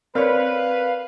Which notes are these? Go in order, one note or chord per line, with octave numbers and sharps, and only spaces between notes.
C4 A#4 B4 C#5 D5 F5